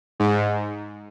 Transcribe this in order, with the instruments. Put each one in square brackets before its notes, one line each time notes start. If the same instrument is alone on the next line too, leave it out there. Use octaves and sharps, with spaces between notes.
[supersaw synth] G#2